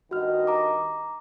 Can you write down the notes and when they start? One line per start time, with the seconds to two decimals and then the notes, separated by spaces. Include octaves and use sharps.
0.11 G2 D#3 F#4 D#5 F6
0.47 A#5 D6